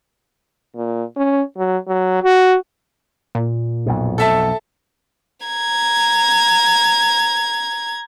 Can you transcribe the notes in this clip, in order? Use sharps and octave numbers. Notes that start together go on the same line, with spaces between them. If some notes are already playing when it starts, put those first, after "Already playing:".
A#2
C#4
F#3
F#3
F#4
A#2
B1 F2 B2
A4 E5 A5
A#5 G#6